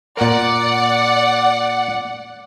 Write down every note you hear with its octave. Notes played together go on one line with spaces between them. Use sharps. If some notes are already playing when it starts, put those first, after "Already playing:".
A#2 A#4 D5 F#5